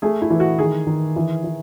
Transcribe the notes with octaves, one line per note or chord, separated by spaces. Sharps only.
A3 G#4
E4
E3
F#4
D#3 G#4
D#3
E3
E3